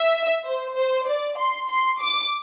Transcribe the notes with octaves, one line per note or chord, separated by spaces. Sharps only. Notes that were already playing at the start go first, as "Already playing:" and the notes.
Already playing: E5
C5
C5
D5
C6
C6
D6